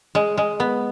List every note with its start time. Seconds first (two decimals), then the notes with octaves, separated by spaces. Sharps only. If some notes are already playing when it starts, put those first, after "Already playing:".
0.15 G#3
0.38 G#3
0.60 B3